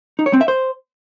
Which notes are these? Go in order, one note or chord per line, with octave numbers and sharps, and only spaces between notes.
D#4
C#5
C4
E5
C5